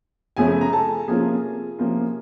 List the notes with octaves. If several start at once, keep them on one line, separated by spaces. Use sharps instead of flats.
F#2 C#3 F3 A3 C#4 G#4 G#5
A#5
A4 A5
C3 F3 A#3 C#4 F4 G#4 G#5
C3 F3 A#3 C#4 F4